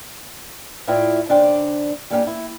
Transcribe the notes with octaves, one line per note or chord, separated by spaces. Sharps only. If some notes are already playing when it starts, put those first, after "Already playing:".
A2 A3 E4 F4 D5 G5
D#2 C#3 D4 C5 D5 G5
G3 A#3 C#4 D4 F4 G4
E4